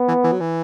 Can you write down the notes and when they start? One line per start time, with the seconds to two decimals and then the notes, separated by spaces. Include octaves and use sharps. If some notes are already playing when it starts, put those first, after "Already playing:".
Already playing: B3
0.08 E3
0.24 E3
0.32 F#3
0.40 E3